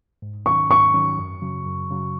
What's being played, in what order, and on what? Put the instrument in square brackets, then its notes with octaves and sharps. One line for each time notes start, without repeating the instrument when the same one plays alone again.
[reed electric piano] G#2
[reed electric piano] D#3 F#3 C#4 [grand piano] C#6
[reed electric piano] G#2 [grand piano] C#6
[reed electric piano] D#3 F#3 C#4
F#2
C#3 F#3
F#2
C#3 F#3